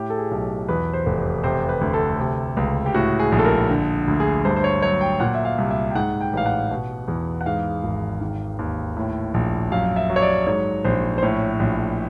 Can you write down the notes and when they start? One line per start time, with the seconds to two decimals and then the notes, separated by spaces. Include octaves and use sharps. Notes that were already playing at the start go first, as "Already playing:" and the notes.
Already playing: A2 G4
0.10 A4
0.18 G#4
0.31 B1
0.69 E2 B4
0.94 C5
1.06 F1
1.19 C5
1.44 C3 C5
1.69 B4
1.81 D2
1.94 A4
2.19 C3
2.57 C#2
2.86 G4
2.94 A2 F#4
3.19 G#4
3.32 A#1
3.39 A4
3.45 A#4
3.70 D3
4.08 D2
4.20 G#4
4.45 G2 C5
4.56 C5
4.64 C#5
4.82 F#3 C#5
5.01 G5
5.20 A#2 F#5
5.34 E5
5.45 F5
5.58 C2
5.70 E5
5.90 G5
5.95 G#2 F#5
6.21 G5
6.33 A1 F5
6.46 F#5
6.71 B2
7.08 E2
7.41 F#5
7.46 G#2 F5
7.84 G#1
8.21 D#3
8.59 D#2
8.97 A2
9.34 A#1
9.72 F#2 F5
9.96 E5
10.10 F#3
10.16 C#5
10.22 D5
10.47 G#2 C#5
10.84 A#1 C5
11.18 C5
11.22 A2 C#5
11.60 A#1